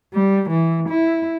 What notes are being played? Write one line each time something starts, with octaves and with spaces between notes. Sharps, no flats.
G3
E3
E4